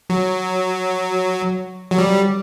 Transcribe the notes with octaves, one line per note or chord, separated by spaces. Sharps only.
F#3
F#3
G3